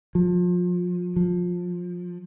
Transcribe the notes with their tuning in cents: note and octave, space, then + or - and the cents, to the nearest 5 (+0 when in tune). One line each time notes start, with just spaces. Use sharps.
F3 +30
F3 +20